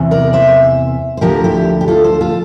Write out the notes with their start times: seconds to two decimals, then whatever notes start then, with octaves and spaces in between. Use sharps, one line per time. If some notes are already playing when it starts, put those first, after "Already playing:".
Already playing: E2 C3 E3
0.11 A#4 D5
0.33 C5 E5
1.17 C5
1.21 D2 D3 F3 G4 A#4
1.44 E4 G4
1.81 G4
1.88 F4 A4
2.04 A4 C5
2.21 F4 A4